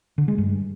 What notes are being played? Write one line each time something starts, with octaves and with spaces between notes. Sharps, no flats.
D3
G#3
G2